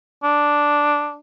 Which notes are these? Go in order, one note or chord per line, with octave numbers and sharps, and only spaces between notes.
D4